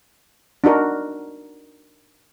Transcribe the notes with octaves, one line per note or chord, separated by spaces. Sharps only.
D4 D#4 F#4 A#4